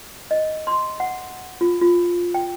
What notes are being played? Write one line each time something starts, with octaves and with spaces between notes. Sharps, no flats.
D#5
C6
F#5
F4
F4
G5